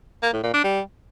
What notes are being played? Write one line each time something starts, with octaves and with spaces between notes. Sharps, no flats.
A#3
A2
A#2
D4
G3